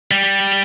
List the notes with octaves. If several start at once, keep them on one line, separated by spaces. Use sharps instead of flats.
G3